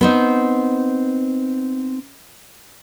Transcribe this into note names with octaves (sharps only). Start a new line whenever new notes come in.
B3 C4 D#4